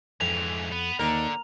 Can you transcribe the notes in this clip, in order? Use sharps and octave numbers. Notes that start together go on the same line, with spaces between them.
F2 G#2 E3 F7
B3
D#2 D3 A#4